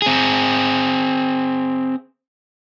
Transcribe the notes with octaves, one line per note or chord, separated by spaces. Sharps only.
C4 G#4